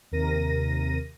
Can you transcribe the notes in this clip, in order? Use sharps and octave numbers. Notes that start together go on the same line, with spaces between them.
D#2 C3 A#4 A#6 D#7